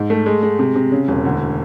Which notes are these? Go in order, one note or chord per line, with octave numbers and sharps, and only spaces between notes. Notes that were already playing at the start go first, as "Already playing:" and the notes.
Already playing: G#2
A3
G#3
G#3
C3
C3
C#3
E1
D2